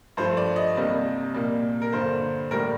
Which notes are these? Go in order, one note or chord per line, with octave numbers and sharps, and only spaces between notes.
G2 F3 A3 C5
D5
D#5
C2 C3 G3 A#3
A#2 G3 A#3
A#4
G2 D3 G3 A#3 C5
A2 G3 A#3 A#4